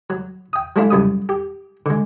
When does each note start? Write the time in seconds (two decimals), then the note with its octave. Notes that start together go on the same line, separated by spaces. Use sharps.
0.10 F#3
0.53 G5 D#6
0.76 F#3 G#3 A3 D4 E4 F4
0.91 C2 F#2 G3 D#6
1.29 G4
1.86 D3 G#3